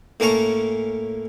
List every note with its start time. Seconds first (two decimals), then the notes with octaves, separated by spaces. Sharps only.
0.20 A2 A#3 C#4 A5 A#5 C#6